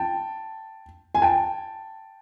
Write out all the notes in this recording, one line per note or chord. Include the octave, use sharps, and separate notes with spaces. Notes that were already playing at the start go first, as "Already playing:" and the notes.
Already playing: G5 A5
G#5
G5 A5